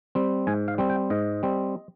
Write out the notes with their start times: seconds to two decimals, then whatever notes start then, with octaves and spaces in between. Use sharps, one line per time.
0.15 G3 C4
0.47 G#2 G#5
0.68 F5
0.78 G3 C4
0.90 G5
1.10 G#2 D#5
1.43 G3 C4